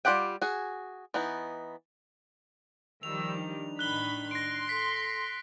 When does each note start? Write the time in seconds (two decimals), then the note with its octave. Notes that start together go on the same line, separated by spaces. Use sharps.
0.05 G3 F4 G4 F#5 G5
0.42 F#4 G#4
1.14 E3 B3 D#4
3.03 D#3 F3 G3 E6 F7
3.38 D4 D#4
3.79 A1 D#3 B5 F#6 G7
4.31 C6 A#6 D7
4.69 A4 B6